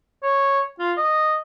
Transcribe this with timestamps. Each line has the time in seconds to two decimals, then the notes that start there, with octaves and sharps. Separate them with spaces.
0.23 C#5
0.79 F4
0.97 D#5